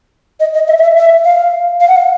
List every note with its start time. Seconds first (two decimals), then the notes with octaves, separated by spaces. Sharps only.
0.40 D#5
0.54 D#5
0.68 E5
0.78 D#5
0.82 E5
0.96 E5
1.25 F5
1.80 F5
1.88 F#5
1.96 F5